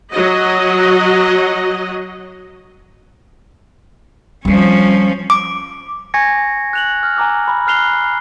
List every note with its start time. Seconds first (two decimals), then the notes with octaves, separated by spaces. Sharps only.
0.12 F#3 F#4 D#5
4.45 F3 G3 C4 C#4
5.30 D6
6.14 G#5 C#6 G#6 A#6 C#7
6.73 F#6 F7 F#7
7.03 F6
7.17 G#5 A#5 D6 E6
7.48 B5
7.67 F6 F#6 C7 F7 G7